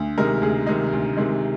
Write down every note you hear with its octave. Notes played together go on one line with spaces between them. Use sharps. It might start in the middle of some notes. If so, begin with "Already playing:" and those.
Already playing: D2
C3 D#3 G#3 D#4 A#4
D2 G#4
C3 D#3 G#3 D#4
D2
C3 D#3 G#3 D#4